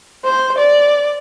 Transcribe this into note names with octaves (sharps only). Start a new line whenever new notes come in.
C5
D5